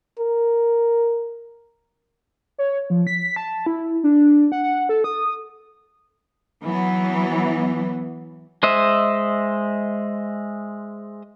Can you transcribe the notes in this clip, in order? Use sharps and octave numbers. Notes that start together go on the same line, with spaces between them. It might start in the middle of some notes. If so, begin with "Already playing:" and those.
A#4
C#5
F3
B6
A5
E4
D4
F#5
F#5
A4
D#6
E3 F#3 B3
G#3 C5 D#5 E5